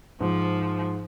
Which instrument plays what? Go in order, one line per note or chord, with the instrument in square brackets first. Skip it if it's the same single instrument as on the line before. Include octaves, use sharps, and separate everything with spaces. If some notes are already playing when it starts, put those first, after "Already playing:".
[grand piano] G#2 [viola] F3